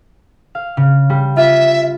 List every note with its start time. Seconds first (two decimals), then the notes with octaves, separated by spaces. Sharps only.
0.55 F5
0.77 C#3
1.10 G3
1.37 F4 E5